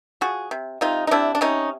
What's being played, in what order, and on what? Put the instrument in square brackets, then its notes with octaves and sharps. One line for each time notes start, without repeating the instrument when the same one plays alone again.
[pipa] F3 F#4 G#4
C3
C3 D#4 F4
D#4
C3 D4 E4
D4
C3 C#4 D#4